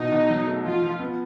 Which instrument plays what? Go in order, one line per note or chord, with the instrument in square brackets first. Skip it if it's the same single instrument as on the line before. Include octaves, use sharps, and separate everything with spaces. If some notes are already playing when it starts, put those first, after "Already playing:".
Already playing: [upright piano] B2 E4 [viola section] D#4
[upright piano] B2
F#3
A3
[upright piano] F3 [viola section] F4
[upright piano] F3
B3